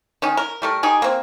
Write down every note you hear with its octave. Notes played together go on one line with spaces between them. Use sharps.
D#3 C#4 D#4
A#4
G3 A3 A#4
D#4 G4 G#4
A#3 C4